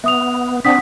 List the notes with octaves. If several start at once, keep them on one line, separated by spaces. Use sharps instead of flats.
B3 E5 D#6 F7
C4 D4 F#5 D#6 B6